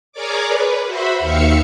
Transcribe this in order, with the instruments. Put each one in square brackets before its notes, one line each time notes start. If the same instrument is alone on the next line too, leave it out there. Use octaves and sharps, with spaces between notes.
[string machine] G#4 A#4 C#5 D5 D6
B4
F#4 C5 E5 B5
D#2 D#3 E5 F5 C#7